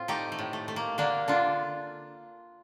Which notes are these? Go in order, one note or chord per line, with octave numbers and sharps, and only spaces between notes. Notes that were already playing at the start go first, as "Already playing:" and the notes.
Already playing: A2 C4 F4
A3 D#4 G4
A3
A2
A3
A3
A#3
D3 A#3 D4
D3 D4 F4